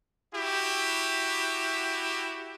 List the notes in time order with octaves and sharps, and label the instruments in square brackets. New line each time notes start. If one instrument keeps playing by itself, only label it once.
[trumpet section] E4 F#4 G4